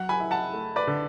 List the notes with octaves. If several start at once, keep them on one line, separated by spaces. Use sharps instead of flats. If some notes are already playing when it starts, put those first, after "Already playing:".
Already playing: F#3 F#5
G#5 B5
E4
F#5 A5
A3
B4 D5
D3